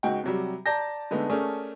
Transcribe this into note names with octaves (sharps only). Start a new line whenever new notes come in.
C#2 D#4 F#4 G5
C3 F#3 G3
D5 A5 A#5 G6 A#6
D3 G#3 A3 B3 D#4
A3 C#4 G#4 A#4 D5